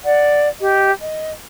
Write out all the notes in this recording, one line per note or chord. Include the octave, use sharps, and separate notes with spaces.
D5 F#5
G4 D#5
D#5